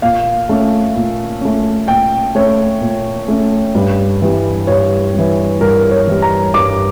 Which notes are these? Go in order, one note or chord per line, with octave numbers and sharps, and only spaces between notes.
A#2 F5
A3 C#4
A#2
A3 C#4
A#2 G5
A3 C#4 C#5
A#2
A3 C#4
G2
E3 G3
G2 C#5
E3 G3
G2 A#4
C#5
E3 G3
A#5
G2 D6